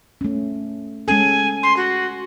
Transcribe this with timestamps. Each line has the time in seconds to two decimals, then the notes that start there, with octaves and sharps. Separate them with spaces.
0.21 A3 C#4
1.08 G#3 C#4 A4 G#5
1.63 C6
1.77 F#4